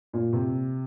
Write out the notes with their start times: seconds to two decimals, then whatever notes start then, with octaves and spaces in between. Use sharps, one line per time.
0.13 A#2
0.33 C3